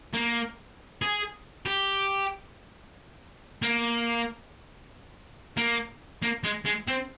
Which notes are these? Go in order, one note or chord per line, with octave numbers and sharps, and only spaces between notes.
A#3
G#4
G4
A#3
A#3
A#3
G#3
G#3
C4